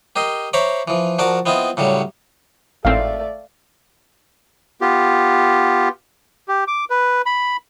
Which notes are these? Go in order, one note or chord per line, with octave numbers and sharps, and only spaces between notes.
G4 A#4 D#5 C6
C5 C#5 E5 A#5 B5 D6
E3 F3
F3 F#4 A#4 D5 A5 D6
B3 C4 E4 F4 D#5
A2 C#3 F#3 G3
G#1 A2 A3 C4 D5 F5
B3 F4 G4
G4
D6
B4
B5